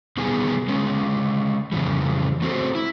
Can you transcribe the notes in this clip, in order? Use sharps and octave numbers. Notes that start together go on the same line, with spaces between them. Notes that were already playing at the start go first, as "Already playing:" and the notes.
B2 D#3 G3 B3 G#4 G#5
D3 G#3 C#4
F2 C#3 E3 G3
A3 C4 F#4 A4 C5
E4